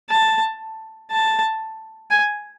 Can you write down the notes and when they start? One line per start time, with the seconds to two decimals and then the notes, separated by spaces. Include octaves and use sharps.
0.10 A5
1.11 A5
2.11 G#5